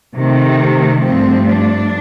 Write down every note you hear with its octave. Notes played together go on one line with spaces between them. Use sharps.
C3 D#3 A3
G2 F3 A3 C4
D4